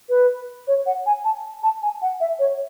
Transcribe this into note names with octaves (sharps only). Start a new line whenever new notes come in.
B4
C#5
F#5
G#5
A5
A5
G#5
F#5
E5
C#5